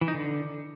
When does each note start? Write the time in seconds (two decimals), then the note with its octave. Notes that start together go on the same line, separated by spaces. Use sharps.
0.01 E3
0.08 D#4
0.14 D3